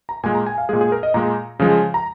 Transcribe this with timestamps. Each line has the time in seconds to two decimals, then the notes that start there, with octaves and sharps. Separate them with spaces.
0.09 A#5
0.23 A#2 G#3 G#5
0.35 A#5
0.46 G#5
0.58 F5
0.69 A#2 G#3 G#4
0.81 G#4
0.92 A#4
1.03 D#5
1.14 A#2 G#3 A#5
1.59 C#3 F3 G#3
1.94 A#5